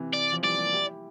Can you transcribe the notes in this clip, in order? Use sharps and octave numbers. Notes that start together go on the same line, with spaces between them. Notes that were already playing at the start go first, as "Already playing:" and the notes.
Already playing: C3 E3
D5
F3
E3 G3 D5
G3 A#3
E4 G4